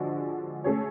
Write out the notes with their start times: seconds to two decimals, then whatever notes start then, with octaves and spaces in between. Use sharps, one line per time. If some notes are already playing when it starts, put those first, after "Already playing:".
Already playing: D3 F3 G#3 D4 F#4
0.64 A3 C#4 G#4 C#5